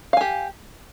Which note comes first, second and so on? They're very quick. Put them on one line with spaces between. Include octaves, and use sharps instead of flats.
F5 G#5 G4